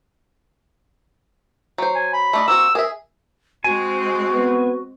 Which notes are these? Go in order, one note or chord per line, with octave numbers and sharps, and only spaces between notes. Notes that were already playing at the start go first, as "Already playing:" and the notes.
F#3 C5
G#5
B5
A3 D4 D#5
A#3 C4 F#4 E6
G#4 A#4 E5
G#3 C4 F#4 G#5
B3